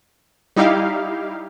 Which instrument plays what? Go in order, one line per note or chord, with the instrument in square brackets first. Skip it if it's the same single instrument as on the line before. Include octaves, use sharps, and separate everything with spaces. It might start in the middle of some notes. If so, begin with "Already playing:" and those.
[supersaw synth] G3 D#4 E4 G4 F5